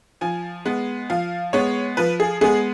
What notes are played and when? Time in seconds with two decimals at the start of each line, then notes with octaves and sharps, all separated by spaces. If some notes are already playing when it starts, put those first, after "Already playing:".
0.21 F3 G#5
0.65 G#3 B3
1.10 F3 F5
1.53 G#3 B3 C#5
1.97 F3 B4
2.20 G#4
2.41 G#3 B3 G#4